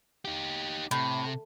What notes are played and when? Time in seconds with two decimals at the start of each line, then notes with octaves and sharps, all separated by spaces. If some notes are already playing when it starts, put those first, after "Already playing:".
0.25 D#4 G4
0.91 A2 C3